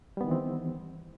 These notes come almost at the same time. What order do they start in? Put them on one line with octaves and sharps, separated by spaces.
G3 B3 D#3 E3 C4